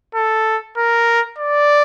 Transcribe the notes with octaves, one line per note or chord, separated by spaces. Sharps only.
A4
A#4
D5